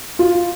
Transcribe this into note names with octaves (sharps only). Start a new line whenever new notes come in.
F4